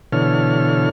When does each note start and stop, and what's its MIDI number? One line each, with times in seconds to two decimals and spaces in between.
0.12 0.89 47
0.12 0.89 50
0.12 0.89 52
0.12 0.89 69
0.12 0.89 73
0.12 0.89 89